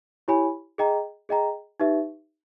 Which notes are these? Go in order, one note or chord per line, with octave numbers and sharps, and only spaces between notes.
E4 G4 C#5 G#5 B5
G#4 D#5 G5 A#5
G#4 D#5 G5 A#5
D#4 G4 B4 E5